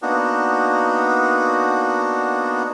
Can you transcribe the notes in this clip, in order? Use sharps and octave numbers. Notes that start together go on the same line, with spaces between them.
A#3 B3 D4 D#4 F#4